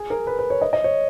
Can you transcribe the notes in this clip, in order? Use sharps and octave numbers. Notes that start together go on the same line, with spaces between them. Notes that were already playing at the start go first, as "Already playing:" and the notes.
Already playing: G#4
A#4
B4
B4
C#5
D#5
D#5
C#5